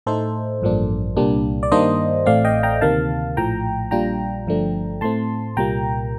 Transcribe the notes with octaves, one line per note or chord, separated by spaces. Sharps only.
A2 A3 D#4 A4 C5
A1 G2 F3 A#3 D4
C2 A#2 G3 A#3 D4
D5
G2 D#3 G3 A#3 D4 C5 D#5
A1 A2 A3 C4 D5 F5
D#5 G5
G5 A#5
D2 C3 D#3 A#3 F5 A5
A#1 A2 F3 G5 A#5
A#1 A#2 G3 D4 F4 G5 A#5
G1 G2 F3 A3 D4
A2 A3 C4 A5 C6
C2 A#2 G3 A#3 G5 A#5